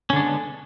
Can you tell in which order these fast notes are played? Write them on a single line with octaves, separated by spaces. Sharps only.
C#4 D3 D4 G#3 B3